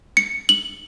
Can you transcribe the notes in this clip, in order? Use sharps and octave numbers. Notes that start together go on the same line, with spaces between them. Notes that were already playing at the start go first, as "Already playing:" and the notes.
C#7
F#7